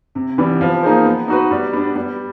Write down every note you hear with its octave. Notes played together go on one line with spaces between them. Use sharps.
C3
E3 G3 B3
F3
A#3 D#4 G#4 C5
B3
D#4 F#4 B4
G3
B3 D4
G3